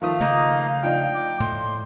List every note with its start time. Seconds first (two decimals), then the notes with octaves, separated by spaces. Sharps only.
0.02 D#3 F3 A3 F5 D#6
0.20 C#3 A3 A#3 D#4 D#5
0.83 F3 D4 D#4 G5
1.14 D6
1.40 A2 C6